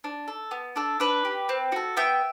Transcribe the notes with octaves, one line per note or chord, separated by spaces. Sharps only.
D4
A4
B3
D4 A4
D4 B4
G4
C4
F#4 A4
B3 E5 G5